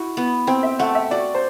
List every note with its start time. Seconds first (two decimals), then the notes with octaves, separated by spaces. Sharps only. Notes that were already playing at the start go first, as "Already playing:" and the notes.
Already playing: E4 F#4
0.17 B3
0.47 C4 G5
0.63 E5
0.79 A3 F#5
0.95 E5
1.11 F#4 D5
1.35 C5